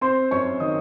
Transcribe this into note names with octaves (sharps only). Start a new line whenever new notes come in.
C4 C5 C6
F#2 C#5 C#6
D#3 D#5 D#6